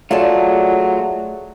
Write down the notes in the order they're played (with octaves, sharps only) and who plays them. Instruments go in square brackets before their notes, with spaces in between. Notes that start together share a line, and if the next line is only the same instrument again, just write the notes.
[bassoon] F#3 [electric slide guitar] A3 F4 [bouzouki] G#4 D5 A5